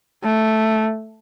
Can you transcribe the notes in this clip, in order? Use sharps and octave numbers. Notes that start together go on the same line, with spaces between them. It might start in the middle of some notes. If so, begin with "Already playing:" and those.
A3